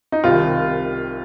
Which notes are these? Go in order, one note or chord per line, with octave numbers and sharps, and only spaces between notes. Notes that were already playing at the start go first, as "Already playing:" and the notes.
D#4
C2 C3 D#3 F4